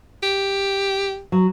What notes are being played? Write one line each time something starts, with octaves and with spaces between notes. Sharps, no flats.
G4
F#3